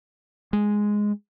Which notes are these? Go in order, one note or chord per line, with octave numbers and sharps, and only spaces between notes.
G#3